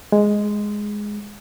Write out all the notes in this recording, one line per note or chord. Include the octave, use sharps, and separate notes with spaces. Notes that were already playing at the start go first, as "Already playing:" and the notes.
G#3